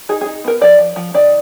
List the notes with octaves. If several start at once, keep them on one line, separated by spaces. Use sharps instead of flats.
D#4 G#4
G#4
D#4
B3 A#4
F3 D5
F3
F3
D#3 D5